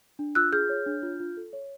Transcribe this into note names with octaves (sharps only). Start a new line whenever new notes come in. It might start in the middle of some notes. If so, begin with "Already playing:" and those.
D4
F4 E6 F#6
G#4 F6 G6
C#5
D4
F4
F4
A4
C#5